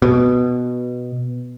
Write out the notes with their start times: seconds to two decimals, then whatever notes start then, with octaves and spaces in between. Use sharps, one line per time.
0.02 B2